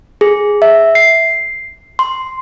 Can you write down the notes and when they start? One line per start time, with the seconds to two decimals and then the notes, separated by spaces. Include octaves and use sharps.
0.21 G#4
0.62 E5
0.95 C7
1.99 C6